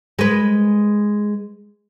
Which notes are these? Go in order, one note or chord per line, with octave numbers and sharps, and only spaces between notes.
G#3 B4